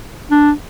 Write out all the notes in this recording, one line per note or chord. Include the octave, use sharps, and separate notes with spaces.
D4